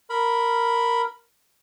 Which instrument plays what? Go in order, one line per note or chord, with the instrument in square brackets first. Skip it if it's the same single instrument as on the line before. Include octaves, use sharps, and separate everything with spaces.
[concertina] A#4 B5